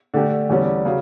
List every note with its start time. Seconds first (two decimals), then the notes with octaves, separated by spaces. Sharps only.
0.14 D3 A3 D4 G4
0.49 E2 D3 G3 C#4
0.85 C#3 F#3